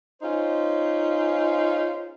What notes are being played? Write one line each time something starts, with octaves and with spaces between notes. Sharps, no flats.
C#4 D#4 F4 G#4 C5